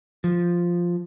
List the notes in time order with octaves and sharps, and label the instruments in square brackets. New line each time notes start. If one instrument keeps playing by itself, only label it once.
[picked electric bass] F3